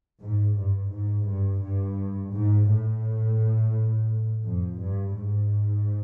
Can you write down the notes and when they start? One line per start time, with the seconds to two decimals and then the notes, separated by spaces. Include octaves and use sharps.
0.22 G#2
0.56 G2
0.91 G#2
1.27 G2
1.62 G2
2.34 G#2
2.68 A2
4.45 F2
4.81 G2
5.16 G#2